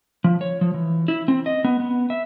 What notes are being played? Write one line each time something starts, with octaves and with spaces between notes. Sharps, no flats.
F3
C#5
F3
E3
E4
C4
D#5
B3
B3
E5